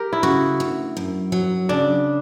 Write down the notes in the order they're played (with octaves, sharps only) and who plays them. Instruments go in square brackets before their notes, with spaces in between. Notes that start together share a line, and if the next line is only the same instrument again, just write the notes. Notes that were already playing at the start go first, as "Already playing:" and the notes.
Already playing: [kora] G4 A#4
E4
[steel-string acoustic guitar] C#3 [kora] F#4
[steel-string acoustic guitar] D2
F#2
F#3
[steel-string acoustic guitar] C#3 [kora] D4